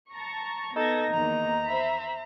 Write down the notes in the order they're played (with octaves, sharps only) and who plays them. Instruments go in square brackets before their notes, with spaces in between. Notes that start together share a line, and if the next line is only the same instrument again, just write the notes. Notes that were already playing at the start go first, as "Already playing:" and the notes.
[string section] A5 A#5 C#6
[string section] B3 G#6 A#6 [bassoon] D#4 [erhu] A4
[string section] E2 D#3 A#3 [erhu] A#5
[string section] C5 E5 B5